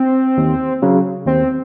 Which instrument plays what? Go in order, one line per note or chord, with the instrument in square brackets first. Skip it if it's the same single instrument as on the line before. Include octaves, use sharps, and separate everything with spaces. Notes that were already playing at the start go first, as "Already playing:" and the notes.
Already playing: [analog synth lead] C4
[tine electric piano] D#2
C#3 F#3
[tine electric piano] D#2 [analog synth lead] C4